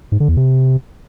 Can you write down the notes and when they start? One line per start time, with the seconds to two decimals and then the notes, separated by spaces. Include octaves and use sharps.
0.12 G#2
0.20 D3
0.29 E2
0.37 C3